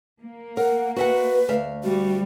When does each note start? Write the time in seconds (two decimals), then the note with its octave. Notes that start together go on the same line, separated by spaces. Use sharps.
0.21 A#3
0.57 A#4 F#5
0.96 F#4 B4 E5 F#5
1.49 D2 E5 F5
1.84 G3 F#4